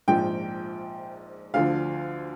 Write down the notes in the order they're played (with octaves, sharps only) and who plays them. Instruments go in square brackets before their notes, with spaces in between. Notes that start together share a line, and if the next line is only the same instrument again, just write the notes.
[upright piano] A#1 G#2 F3 G5
D2 D3 F3 F5